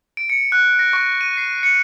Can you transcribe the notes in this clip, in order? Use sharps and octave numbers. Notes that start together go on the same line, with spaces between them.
D7
C#7
F#6
A#6
C#6
D#7
C7
C#7